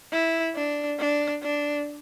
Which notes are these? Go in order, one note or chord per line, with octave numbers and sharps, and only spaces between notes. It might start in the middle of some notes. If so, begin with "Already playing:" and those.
E4
D4
D4
D4